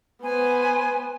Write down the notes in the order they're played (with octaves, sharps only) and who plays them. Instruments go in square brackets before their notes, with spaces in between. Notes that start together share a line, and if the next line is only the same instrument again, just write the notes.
[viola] B3 C5 [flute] G#5